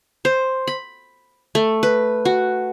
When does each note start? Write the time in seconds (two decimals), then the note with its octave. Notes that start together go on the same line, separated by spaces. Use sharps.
0.25 C5
0.67 B5
1.55 A3
1.83 B4
2.25 F#4